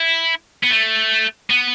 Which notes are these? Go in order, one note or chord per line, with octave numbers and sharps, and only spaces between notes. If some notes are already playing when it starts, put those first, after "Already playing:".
Already playing: E4
B3
A3
B3